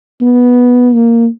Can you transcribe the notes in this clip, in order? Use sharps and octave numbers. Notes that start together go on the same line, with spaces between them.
B3
A#3